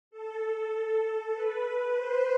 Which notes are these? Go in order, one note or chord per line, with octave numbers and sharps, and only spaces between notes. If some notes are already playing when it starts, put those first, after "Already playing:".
A4
B4
C5